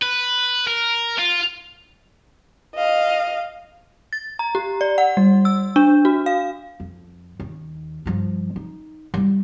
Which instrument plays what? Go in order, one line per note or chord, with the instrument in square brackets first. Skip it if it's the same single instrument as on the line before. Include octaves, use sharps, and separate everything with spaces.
[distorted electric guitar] B4
A#4
F4
[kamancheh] D#5 F5
[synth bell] A6
A#5
G4
D5
F#5
G3
E6
D4
F#4
F5
[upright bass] F2
D#2
G2 F3
D#4
G3 E4